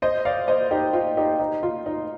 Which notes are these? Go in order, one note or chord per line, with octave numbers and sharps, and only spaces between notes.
C5 D#5
D5 F5
C5 D#5
D#4 G4
F4
D#4 G4
D#4
F4
D#4